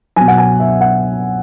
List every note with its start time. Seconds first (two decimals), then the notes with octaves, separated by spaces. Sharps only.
0.16 B2 F#3 G#5
0.28 F#5
0.38 G#5
0.60 E5
0.81 F#5